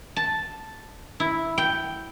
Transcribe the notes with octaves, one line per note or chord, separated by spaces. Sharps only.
A5
E4
G5